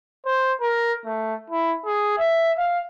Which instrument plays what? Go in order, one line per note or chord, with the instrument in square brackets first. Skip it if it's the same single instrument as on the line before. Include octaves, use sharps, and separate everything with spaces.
[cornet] C5
A#4
A3
E4
G#4
E5
F5